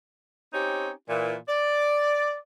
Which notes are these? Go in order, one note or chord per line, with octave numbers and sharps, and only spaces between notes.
C4 C#4 D#4 G4
A#2 E3
D5